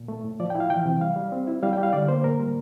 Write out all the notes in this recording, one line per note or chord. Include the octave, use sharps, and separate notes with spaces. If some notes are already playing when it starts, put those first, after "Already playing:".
Already playing: A#2
A3
A2
F3 D5
G5
E4
F5
E3 G5
C3
G3 F5
G3
C4
E4
G3 F5
G5
G3
F5
D3 D5
A#3 C5
A2 A#4
G3